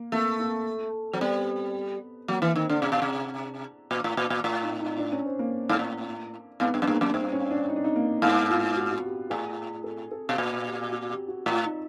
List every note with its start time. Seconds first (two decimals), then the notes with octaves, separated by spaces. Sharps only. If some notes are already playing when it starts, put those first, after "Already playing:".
Already playing: A#3
0.12 A3 A#3
0.40 A#3
1.13 F#3 C4
1.21 G3 B3
2.28 F#3 A#3
2.42 E3
2.55 D#3 C4
2.69 D3
2.82 C3 D4
2.92 B2
3.02 C3
3.91 A#2
4.04 A2
4.17 A#2
4.30 A#2
4.44 A2
4.62 D#4
4.80 D#4
4.98 D4
5.12 C#4
5.26 C4
5.39 A#3
5.69 G#2
5.79 A2
6.60 G#2 B3
6.74 G2
6.82 F#2
6.87 G2 A#3
7.01 F#2
7.14 G2 C4
7.33 C#4
7.51 D4
7.68 D#4
7.76 D4
7.84 D#4
7.96 A#3
8.22 G#2 B3
8.50 F4
8.77 F#4
8.92 F#4
9.04 G4
9.30 A2 G#4
9.84 A4
10.11 A4
10.29 B2
10.38 A#2
10.66 G4
10.92 F#4
11.11 G4
11.28 F#4
11.46 A2 F4
11.64 D#4